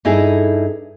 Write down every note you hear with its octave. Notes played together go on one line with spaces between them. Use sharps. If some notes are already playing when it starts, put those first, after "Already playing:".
G2 D#4 E4 G#4 A4